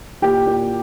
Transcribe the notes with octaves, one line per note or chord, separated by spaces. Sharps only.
A#2 G4
A#2